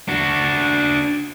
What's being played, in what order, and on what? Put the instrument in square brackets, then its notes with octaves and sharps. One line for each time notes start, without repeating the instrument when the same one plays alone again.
[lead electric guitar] D4 F#4